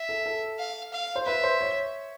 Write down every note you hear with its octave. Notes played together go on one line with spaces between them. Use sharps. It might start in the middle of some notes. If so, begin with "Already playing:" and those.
Already playing: E5
A4
A4
F5
F5
C5
B4 E5
C5
C#5